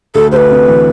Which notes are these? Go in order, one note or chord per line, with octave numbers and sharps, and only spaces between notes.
D2 A4
D2 B4 C5
C3
E3